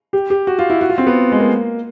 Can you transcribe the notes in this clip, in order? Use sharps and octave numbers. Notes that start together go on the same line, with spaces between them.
G4
G4
F#4
F4
E4
F#4
F4
C4
B3
G#3
A#3